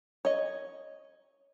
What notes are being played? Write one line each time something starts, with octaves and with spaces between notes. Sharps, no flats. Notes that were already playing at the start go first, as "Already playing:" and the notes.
C#5 D#5